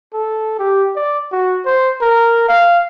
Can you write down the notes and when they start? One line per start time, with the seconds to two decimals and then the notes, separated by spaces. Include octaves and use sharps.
0.14 A4
0.59 G4
0.96 D5
1.32 F#4
1.66 C5
2.01 A#4
2.48 F5